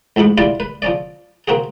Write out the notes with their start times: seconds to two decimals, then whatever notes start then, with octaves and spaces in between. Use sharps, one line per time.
0.16 A1 F2 G#2 B5 C#6
0.38 G3 E4 F4 D5
0.60 B4
0.82 F3 C#4 D5
1.48 A#3 C4 F#4 G#4